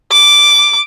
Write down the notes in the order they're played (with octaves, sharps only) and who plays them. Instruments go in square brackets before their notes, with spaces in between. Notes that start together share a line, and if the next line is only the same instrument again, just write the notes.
[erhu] D6